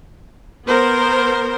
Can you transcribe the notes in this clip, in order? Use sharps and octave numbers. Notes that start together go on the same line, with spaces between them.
B3 A#4 C5